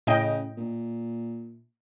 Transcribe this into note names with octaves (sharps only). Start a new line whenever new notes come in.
A2 C#3 D#5 G5
A#2